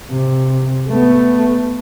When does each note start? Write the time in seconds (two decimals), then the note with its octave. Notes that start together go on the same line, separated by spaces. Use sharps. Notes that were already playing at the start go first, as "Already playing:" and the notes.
0.11 C3
0.89 A3 B3